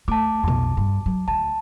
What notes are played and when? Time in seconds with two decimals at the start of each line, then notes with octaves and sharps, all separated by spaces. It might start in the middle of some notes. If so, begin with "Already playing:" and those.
0.08 A3 A5 D6
0.43 B1 F2
0.77 G2
1.06 F#3
1.28 D2 A5